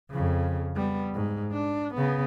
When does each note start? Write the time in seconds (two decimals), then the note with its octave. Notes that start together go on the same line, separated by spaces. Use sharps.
0.10 F2 C#3
0.75 G3 B3
1.14 G#2
1.52 D4
1.95 C#3 B3